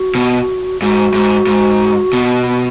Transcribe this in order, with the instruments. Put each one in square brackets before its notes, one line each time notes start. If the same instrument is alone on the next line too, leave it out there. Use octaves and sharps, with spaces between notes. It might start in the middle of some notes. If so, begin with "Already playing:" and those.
Already playing: [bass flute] F#4
[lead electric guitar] B2
[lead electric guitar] G#2 [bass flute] F#4
[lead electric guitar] G#2
G#2
B2